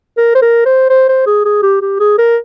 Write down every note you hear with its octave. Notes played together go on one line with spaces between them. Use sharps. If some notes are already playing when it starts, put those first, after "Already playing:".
A#4
C5
A#4
C5
C5
C5
G#4
G#4
G4
G4
G#4
A#4